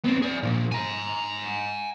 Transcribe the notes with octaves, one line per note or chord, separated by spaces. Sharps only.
B3 C4
G#4 D5
A#2 F3
G#5 A#5